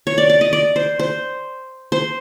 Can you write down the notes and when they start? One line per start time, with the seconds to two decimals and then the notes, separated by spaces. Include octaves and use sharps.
0.07 C#5
0.18 D5
0.30 D5
0.41 D#5
0.53 D5
0.76 C5
1.00 C5
1.92 C5